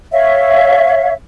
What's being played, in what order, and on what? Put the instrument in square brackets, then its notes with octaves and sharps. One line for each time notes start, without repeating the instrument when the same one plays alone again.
[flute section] C#5 E5 F5